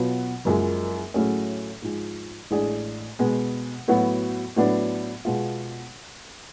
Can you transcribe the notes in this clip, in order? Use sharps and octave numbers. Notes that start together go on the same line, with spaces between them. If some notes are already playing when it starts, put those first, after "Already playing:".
Already playing: B2 F#3 B3 F4
F#1 F#2 F3 G#3
A2 F#3 A3 C#4 G#4
G#2 F3 G#3
A1 A2 G#3 D4 G#4
B2 G#3 B3
A2 F#3 B3 F#4
A2 F#3 B3 D4
B2 G#3 B3 F4